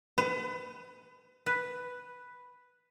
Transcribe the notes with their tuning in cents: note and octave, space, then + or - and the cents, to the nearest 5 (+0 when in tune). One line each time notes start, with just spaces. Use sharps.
B4 +35
B4 +0